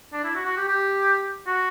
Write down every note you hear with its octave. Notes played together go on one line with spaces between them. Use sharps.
D4
E4
F#4
F#4
G4
G4
F#4